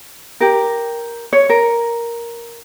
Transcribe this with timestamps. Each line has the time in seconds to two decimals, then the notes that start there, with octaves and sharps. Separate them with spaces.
0.41 G4 A#4
1.33 C#5
1.49 A#4